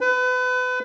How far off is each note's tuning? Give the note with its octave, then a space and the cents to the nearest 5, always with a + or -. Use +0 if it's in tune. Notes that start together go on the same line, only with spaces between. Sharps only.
B4 +30